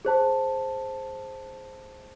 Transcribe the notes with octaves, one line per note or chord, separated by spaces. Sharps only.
G#4 C5 A5